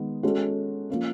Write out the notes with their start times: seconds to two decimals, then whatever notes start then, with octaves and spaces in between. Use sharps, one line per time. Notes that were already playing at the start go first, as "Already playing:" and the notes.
Already playing: D#3 G#3 B3 D#4
0.23 G#3 C#4 F#4 A4
0.90 F3 A#3 C#4